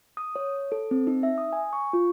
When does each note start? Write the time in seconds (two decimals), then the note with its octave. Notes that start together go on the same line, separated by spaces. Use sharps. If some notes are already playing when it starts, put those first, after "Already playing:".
0.17 D#6
0.36 C#5
0.72 A4
0.91 C4
1.07 D#4
1.23 E5
1.38 D#6
1.53 G#5
1.73 C#6
1.93 F4